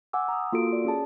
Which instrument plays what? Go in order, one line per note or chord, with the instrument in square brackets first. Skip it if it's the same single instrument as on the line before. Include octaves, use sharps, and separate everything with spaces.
[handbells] F#5 G#5 D6 E6
A#5 D#6
A#3 F4 F#4 A4 D7
D5
C#4 G#4 A5